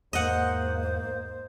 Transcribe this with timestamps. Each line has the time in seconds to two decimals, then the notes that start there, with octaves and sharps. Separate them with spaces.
0.13 E2 G#2 A#3 C5 D#5 F#5